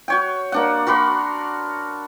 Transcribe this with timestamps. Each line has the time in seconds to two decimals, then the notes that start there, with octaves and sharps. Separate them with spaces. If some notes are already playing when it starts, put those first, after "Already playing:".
0.08 F#4 C#5 G5
0.52 A#3 D4 F#5
0.87 F#4 A#4 B5 C6